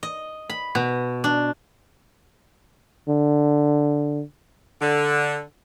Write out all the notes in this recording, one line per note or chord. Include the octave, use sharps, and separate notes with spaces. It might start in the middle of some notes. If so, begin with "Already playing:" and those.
D#5
B5
B2
D4
D3
D3